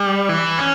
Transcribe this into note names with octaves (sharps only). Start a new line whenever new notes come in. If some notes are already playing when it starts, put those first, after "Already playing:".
Already playing: G3
E3
C#4